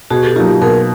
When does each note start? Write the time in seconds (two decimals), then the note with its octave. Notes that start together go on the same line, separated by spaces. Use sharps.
0.10 B2 F#4 G#4
0.23 G4 A4
0.36 F#3 A#3 D#4 F4 G4
0.62 B2 G#4 A#4